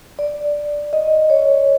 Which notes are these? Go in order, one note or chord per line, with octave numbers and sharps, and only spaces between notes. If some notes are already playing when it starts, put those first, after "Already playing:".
D5
D#5
C#5